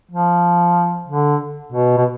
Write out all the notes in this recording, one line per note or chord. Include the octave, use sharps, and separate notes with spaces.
F3
D3
B2
B2